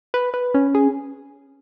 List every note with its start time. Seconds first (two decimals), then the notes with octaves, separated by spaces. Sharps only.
0.14 B4
0.34 B4
0.54 C#4
0.75 G#4